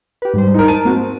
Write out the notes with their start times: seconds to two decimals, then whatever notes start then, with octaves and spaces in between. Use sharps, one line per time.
0.22 G4 B4
0.34 G#2 G3 C5
0.54 D#4 A#4
0.68 A5 D#7
0.85 A#3 C4 F#4
0.97 C4